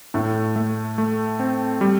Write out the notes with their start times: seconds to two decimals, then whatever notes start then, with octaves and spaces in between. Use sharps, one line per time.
0.14 A2 A3
0.56 A3
0.98 A3
1.40 C4
1.81 G3